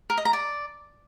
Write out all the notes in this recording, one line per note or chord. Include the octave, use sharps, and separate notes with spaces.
A#4
D#5
A#5
D5